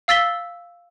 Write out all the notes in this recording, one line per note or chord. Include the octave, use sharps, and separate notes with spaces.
F5 E6 A6 B6 G7